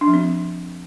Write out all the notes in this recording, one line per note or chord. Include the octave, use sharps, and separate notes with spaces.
D4
F3
C4